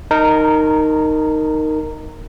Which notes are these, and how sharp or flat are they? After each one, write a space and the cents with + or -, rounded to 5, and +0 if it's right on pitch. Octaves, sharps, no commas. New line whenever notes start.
D#4 -5 A#4 -10 A5 +30